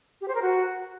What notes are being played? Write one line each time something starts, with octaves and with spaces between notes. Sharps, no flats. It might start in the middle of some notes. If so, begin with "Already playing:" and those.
G4
C5
A#4
F#4